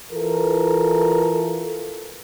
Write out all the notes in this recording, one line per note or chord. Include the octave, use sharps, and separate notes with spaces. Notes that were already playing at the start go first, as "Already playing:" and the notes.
E3 F4 A4 A#4